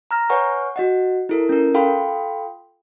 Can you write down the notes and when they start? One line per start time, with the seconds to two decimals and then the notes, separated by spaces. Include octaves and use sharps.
0.11 A#5 F6 A#6
0.29 B4 C#5 F#5 G#5 C#6 F6
0.76 F#4 D#5 F#5
1.29 E4 A4 A#4
1.49 C#4 A#4
1.74 F4 A4 F5 G5 B5 C6